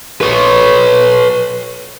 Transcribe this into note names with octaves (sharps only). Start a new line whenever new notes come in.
B4 C#5